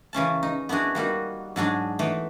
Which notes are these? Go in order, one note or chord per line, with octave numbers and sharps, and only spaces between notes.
C#3 E3 C#4 A5
D#4
B3 D4 E4 F#4 G#4
G3 A#3 D#4 F#4
G#2 F#3 D4 G#4
E3 A3 B3 D#4